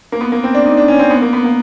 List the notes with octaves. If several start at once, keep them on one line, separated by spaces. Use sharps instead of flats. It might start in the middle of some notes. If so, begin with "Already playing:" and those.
A#3
B3
A#3
C4
D4
D#4
D4
C#4
C4
B3
A#3
B3
A#3